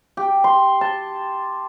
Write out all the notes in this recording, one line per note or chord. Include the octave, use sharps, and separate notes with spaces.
G4
C6
A5